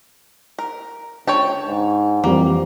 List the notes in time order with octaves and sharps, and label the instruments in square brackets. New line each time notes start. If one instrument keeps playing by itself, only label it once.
[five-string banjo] A#4
[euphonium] C#2 [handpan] D4 [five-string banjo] C#5 G5 A5
[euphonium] G#2
[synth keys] F2 E3 G3 [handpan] F3 G4 A#4 [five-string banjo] A#3 [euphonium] C4